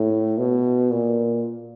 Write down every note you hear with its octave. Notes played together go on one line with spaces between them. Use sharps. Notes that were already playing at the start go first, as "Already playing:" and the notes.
Already playing: A2
B2
A#2